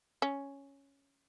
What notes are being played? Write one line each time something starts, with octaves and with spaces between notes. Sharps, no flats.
C#4